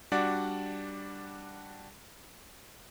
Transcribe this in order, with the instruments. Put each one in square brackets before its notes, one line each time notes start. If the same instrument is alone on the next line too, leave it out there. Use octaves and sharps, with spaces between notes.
[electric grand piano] G3 D4 F#4 D5